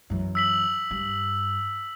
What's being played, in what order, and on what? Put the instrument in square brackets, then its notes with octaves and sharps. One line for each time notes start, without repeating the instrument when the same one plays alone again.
[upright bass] F#2 E3
[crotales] E6 B6 F#7
[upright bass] G2